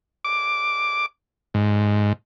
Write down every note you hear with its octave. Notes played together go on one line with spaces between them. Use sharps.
D6
G#2